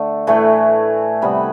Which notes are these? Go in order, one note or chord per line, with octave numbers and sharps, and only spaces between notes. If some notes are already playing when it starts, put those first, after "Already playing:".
Already playing: D3 A3 A4
A2 E3 A3
C3 G3 B3 B4